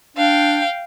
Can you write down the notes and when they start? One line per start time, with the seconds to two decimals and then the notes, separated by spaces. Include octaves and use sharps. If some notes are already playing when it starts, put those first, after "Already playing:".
0.17 D4 F5 G5